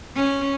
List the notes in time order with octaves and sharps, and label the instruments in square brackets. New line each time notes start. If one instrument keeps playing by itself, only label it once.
[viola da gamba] C#4